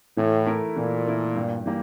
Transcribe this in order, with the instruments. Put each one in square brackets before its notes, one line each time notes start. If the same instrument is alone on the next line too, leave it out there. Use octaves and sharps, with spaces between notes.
[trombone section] A2 [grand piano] E3
[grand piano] A3 E4 A#4
[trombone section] A#2 [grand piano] E3
[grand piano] A3 E4 A#4
G2
E3 G3 A#3